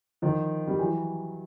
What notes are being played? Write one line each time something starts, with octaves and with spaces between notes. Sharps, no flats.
D#3 F3
G3
E3 F#3